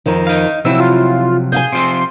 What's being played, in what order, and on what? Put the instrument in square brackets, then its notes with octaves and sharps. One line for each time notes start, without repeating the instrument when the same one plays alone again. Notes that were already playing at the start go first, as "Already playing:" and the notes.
[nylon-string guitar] F2 D#3 F3
[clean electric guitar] D#4 F5
[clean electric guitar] C3 F3 F#3 [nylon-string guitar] C4 E4 [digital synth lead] E6
[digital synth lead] F4
[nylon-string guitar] G#4 F5 G#5 [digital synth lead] G6
[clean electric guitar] C3 F3 C4 [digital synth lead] C6